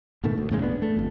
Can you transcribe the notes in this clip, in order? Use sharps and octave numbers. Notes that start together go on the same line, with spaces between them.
G#2 B2 D#3 A3
D2
E2 A2 C#3 G#3
G#1 B3 D4
A3
G1 F2